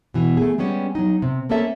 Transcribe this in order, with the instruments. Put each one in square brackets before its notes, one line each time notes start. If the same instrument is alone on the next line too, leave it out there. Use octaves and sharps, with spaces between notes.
[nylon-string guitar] B2 E3
A3 G#4
G3 G#3 B3 C#4 F4 G4
F#3 D#4
C3
A3 A#3 C4 C#4 A4 E5